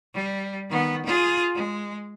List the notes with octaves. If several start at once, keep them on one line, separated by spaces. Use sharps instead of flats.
G3
D#3 B3
F4 G#4
G#3